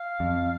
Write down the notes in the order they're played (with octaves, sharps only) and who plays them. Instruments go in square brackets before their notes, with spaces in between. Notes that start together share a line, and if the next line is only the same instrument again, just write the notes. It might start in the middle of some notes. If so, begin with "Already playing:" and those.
Already playing: [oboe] F5
[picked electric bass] F2